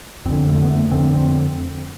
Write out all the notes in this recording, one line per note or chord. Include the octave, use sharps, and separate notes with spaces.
F2 D3 C4
A3
B3
A3
F2 D3 C4
C4